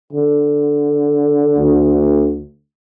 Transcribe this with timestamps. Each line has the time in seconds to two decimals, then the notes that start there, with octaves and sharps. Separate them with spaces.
0.13 D3
1.59 D2